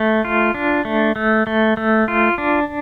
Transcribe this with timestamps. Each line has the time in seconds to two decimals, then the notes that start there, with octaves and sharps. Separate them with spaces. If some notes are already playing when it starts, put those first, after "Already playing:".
Already playing: A3
0.25 F4
0.54 D4
0.85 A3
1.16 A3
1.47 A3
1.77 A3
2.08 F4
2.38 D4